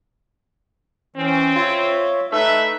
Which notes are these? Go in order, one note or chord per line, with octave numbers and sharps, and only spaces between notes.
E3 C4 C#4
F4 C#5 E5
A3 D#4 B4 E5